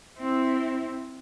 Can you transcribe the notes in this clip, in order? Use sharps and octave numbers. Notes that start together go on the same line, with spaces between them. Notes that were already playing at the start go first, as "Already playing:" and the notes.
C4 E4